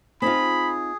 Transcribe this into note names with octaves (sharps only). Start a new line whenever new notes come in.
C4 D#4 F4 G#4 B5